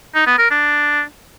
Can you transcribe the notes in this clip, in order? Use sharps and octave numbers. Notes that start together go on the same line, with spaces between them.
D#4
B3
A#4
D4